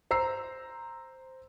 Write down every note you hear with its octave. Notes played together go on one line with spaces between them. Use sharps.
C5 A#5 E6 C7